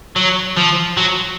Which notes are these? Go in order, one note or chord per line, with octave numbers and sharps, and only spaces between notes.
F#3
F3
F#3